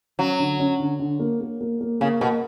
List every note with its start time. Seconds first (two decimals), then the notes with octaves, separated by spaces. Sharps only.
0.19 F#3 C#4
0.39 D3
0.59 C#4
0.80 D3
1.00 D3
1.19 A#3
1.41 A#3
1.61 A#3
1.81 A#3
2.01 C#3 A#3
2.21 B2 A#3